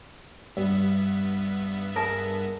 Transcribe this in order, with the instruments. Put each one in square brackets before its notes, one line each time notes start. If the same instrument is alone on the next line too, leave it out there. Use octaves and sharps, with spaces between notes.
[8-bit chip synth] G2 B3 E5 [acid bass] G3
[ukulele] G#4 A#4 A5